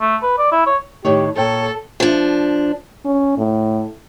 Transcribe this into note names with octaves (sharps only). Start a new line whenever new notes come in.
A3
B4
D5
E4
C#5
A2 D#3 G4 C#5
A#2 A4 C#5 G5
F3 D4
C#4
A2